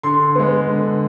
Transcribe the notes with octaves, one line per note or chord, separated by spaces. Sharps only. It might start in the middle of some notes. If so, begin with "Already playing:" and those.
D3 C6
G#3 B3
D3